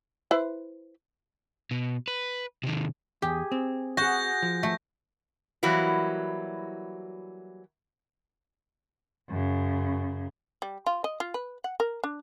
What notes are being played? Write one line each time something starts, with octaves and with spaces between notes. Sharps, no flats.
E4 B4 C5
B2
B4
C3 D#3
E2 G4 G#4
C4
F#4 G#4 F#5 G6 A#6
F3
A3
E3 F#3 G3 A#3 E4 F#4
F#2 C#3
G3
F4
D#5
F4
B4
F#5
A#4
D4